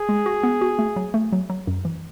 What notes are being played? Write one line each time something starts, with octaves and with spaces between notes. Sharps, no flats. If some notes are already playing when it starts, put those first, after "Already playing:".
Already playing: G#4
G#3
F#4
B3
F#4
A3
F#3
A3
F#3
F#3
F#2
E3